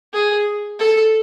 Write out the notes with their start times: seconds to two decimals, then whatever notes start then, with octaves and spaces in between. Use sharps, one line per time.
0.13 G#4
0.79 A4